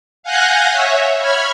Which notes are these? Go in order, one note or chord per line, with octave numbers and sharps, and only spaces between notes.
F5 F#5 G#5 F#6 G6 A#6
C#5 E5
C#5 B5 F6 G#6